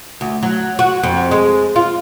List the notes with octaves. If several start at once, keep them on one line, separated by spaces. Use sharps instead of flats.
D2
F#3
F#4
F2
G#3
F4